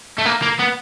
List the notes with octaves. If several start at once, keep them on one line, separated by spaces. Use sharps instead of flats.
A3
A#3
A#3
B3